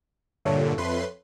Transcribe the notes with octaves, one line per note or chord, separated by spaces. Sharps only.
G2 A#2 D3 A4 C#5 E5
F2 B4 C6